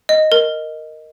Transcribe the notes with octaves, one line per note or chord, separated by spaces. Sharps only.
D#5
A#4